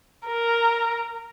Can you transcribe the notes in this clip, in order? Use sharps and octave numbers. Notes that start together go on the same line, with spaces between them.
A#4